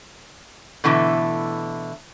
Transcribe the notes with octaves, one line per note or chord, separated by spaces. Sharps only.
B2 D3 E3 A3